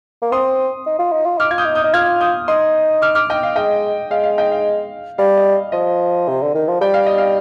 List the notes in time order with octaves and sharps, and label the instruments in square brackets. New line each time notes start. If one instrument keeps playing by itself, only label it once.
[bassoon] A#3
[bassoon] C4 [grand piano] C6 D#6
[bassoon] D#4
F4
D#4
F4
[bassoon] D#4 [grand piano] D6 F6
[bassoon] F4 [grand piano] G#6
[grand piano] D#6 G6
[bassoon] D#4
[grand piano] D#6 G6
[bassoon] D#4
[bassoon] F4 [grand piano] F6 G#6
[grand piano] D#6 G6
[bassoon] D#4 [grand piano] C6 D#6
[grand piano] D6 F6
D6 F6
D#5 G5
F5
[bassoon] G#3 [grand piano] D#5 G5
[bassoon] G#3 [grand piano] F5
[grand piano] F5
D#5 G5
F5
[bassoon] G3 [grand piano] F5
[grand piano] D#5
[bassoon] F3 [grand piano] D#5
[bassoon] C3
D3
D#3
F3
[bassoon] G3 [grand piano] G5
[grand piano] F5
D#5
F5